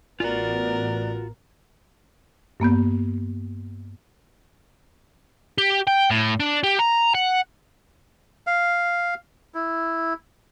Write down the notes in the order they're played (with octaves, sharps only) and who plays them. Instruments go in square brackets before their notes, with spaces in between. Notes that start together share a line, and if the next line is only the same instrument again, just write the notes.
[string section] A1 B3 [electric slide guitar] F4 F#4 [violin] A#4 [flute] D5
[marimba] G2 A#3 B3 G6
[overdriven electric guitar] G4
G5
A2
D4
G4
A#5
F#5
[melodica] F5
E4